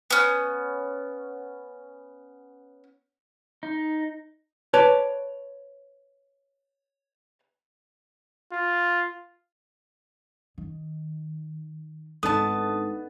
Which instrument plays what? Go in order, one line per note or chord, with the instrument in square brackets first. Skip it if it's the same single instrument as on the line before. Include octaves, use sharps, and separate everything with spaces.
[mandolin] B3 C#4
[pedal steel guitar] D#4
[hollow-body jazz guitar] B4 C#5 D5 A5
[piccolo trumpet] F4
[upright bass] D#3
[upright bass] G#1 [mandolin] B3 A5 [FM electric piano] D4 D#4 A4 [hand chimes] D#6